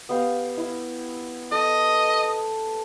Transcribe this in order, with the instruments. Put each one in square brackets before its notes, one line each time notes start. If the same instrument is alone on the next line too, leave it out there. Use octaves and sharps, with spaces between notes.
[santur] B3 G4 F5
E4
[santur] A4 [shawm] D#5